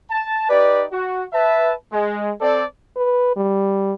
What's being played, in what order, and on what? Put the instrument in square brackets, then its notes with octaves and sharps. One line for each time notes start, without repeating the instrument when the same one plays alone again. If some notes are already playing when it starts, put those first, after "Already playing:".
[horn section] A5
D#4 G4 B4 D5
F#4
B4 E5 A5
G#3
C4 A4 D5
[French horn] B4
G3